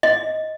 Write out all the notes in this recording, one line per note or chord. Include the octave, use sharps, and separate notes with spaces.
D#5